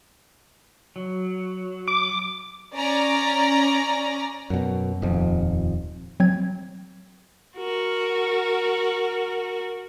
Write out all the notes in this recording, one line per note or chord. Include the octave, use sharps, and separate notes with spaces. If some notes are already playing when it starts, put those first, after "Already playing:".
F#3
D6
C#4 D5 A#5
F#2 B2
D#1 F2
F#3 C4 G#6
F#4 A#4